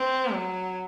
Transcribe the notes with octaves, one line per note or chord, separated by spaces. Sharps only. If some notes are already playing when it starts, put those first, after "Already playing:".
Already playing: C4
F#3